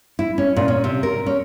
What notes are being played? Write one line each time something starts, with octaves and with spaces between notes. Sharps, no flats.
E4
C#4
A#2
C#4
C3
A#4
C#4